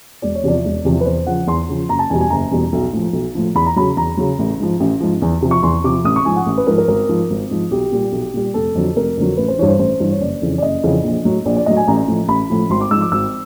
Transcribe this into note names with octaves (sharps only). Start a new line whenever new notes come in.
E1 D5
C#5
E2 C3 F3 D5
E1
E2 C3 F3
B4
E2 C5
C#3 F3 F#5
E2 C6
C#3 F3
F#1 A#5
A5
E2 B2 G3 G#5
G#5
F#1 A#5
E2 B2 G3
B1
A2 F3
B1
A2 F3
E2 B5
A#5
C#3 F#3 B5
E2 A#5
C#3 F#3
A1
G#2 F3
A1
G#2 F3
E2
C3 F3
C#6
E2 C6
C3 F3 D6
A1 D#6
C#6
G#2 F3 G#5
F#5
A1
B4
G#2 F3 A#4
A#4
G#1 A#4
G#2 F3
G#1
G#2 F3
B1 G4
A#2 G3
B1
A#2 G3
F1 A4
F2 D3 F#3
F1 A#4
F2 D3 F#3
A1 B4
C5
G2 E3 C#5
C5
A1 C5
G2 E3
C#5
F#1 D5
F2 C#3 E3
D5
F#1 D#5
F2 C#3 E3
A#1
A2 F#3
A#1 D5
D5
A2 F#3 D#5
G#5
A1 A#5
A2 F3
A1 B5
A2 F3
G#1 C6
D6
G#2 F3 E6
D6
G#1 E6